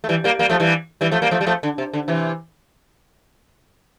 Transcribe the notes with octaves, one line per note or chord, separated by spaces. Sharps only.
A3
E3 G3
G3 A#3
G3 A#3
F3 A3
E3 G3
E3 G3
F3 A3
G3 A#3
F3 A3
G3
F3 A3
D3
C3
D3
C3 E3